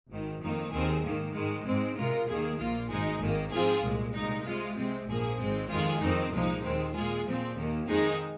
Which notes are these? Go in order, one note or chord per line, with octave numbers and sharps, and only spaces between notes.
G#1 G#2 D#3
F2 D#3 A#3 D#4
D#2 D#3 C4 G#4
G#2 D#3 A#3
G#2 D#3 G#3
G#2 G#3 C4
C3 G#3 F4 A#4
D#2 D#3 A#3 G#4
A#1 A#2 A#3 F4
G#1 G#2 G#3 D#4 G#4
G#1 G#2 D#3 A#3
G#2 F3 C4 F4 G#4
C2 A#2 G#3
C2 A#2 G#3 D#4
C3 G#3 F4
C3 G#3 C4
A#1 G#2 F3 A#3 G#4
G#1 G#2 G#3 C4
F2 D#3 G#3 F4 G#4
F2 D#3 C4 D#4
C2 A#2 F3 G#3 D#4
D#2 D#3 G#3 C4
A#2 G#3 F4 G#4
A#2 F3 C4
D#2 D#3 A#3
F2 D#3 G#3 D#4 G#4